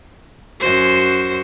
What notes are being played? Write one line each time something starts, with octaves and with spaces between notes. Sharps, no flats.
F#2 F#4 C5